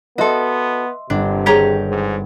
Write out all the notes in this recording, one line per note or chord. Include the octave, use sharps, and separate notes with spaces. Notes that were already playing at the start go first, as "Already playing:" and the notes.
B3 F#4 A4 D#5 E5 C6
G1 C3 D4
D#3 G4 G#4 C#5 A#5
G#2